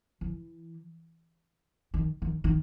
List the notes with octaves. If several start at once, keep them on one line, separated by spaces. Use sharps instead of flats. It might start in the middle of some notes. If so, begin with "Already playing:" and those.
E3
D#3
D#3
D#3